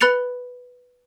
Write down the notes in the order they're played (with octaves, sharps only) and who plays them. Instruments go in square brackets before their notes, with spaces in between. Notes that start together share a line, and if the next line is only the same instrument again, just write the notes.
[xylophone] B4 B5 F#6 A6 C#7 F7